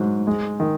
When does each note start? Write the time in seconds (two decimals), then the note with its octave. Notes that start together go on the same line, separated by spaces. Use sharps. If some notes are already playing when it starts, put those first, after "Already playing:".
Already playing: G#2 F#3
0.27 G#3
0.60 D#3